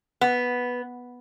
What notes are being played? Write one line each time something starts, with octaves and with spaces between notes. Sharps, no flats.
B3